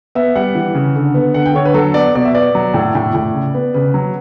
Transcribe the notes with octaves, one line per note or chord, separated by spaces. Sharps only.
B3 E5
G3 F#5
E3
C#3
D3
B3
D3 F#5
G5
D3 C#5
B4
F#3 A4
B3 D5
B2 D5
E5
B3 D5
F#3
A2
A2
A2
C#3
B3
C#3 B4
F#3